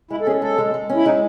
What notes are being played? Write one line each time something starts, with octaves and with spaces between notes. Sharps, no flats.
G#3 E4
A4
C#4 G#4
G#3 A4
G#3
G#3
C#4
E4
G#3 D#4